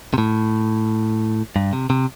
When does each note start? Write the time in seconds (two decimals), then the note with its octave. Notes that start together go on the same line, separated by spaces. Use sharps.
0.14 C3
0.18 A2
1.56 G2
1.73 C3
1.90 C3